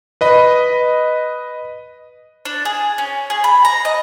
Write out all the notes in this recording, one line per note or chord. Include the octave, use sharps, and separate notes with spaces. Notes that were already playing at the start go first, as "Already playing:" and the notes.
B4 D#5 B5
D4
G#4
C#4
G#4
B5
A#5
D#5